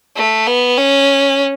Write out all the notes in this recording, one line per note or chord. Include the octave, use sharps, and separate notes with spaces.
A3
B3
C#4